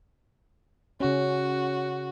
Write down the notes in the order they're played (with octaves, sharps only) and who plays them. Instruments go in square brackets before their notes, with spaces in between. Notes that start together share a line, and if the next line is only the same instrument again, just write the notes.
[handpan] C#3 C#4 [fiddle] F#4